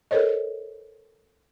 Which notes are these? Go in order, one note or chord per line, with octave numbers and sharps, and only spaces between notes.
A4 A#4 C5 C#5 D#5